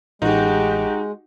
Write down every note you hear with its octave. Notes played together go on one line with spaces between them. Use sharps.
A1 G#3 D#4 F#4 G4